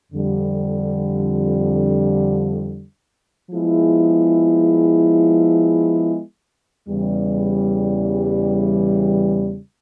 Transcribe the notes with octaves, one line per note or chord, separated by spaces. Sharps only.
F2 D3 G3
F3 G#3 B3 E4 G#4
E2 C#3 E3 G3